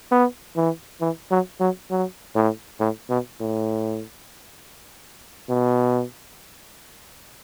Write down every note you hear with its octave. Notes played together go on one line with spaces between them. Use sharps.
B3
E3
E3
F#3
F#3
F#3
A2
A2
B2
A2
B2